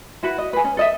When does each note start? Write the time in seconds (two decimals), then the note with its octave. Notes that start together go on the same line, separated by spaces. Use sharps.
0.23 E4 F#4 B4 F#5
0.38 D#5
0.53 G#4 B4
0.65 C#4
0.77 A4 D#5 E5